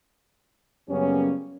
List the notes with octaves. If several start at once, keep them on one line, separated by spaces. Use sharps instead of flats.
F#2 C#3 G3 A#3 B3 C#4